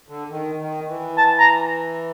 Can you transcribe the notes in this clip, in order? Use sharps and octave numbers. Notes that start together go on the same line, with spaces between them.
D3
D#3
D#3
E3
A5
A#5